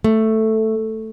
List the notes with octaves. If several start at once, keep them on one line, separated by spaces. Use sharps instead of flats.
A3